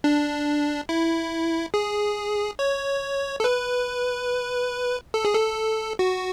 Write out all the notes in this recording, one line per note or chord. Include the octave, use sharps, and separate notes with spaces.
D4
E4
G#4
C#5
A4
B4
A4
G#4
A4
F#4